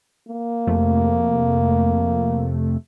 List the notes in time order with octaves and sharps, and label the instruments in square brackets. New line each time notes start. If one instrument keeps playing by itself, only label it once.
[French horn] A#3
[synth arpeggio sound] F2 C3 A3